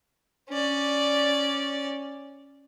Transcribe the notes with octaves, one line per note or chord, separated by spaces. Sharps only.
C#4 D5